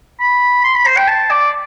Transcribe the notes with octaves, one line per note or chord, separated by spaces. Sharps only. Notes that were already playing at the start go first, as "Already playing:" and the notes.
B5
C6
B5
C5
G5
A5
D5